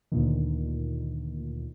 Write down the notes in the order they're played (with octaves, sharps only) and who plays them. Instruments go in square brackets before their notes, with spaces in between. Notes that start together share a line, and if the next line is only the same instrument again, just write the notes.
[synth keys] D2 A#2 D#3